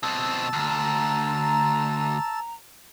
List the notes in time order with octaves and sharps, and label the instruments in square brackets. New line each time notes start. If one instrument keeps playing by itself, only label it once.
[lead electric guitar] B2 C4 [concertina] A5 E6
[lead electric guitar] D2 [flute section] A#5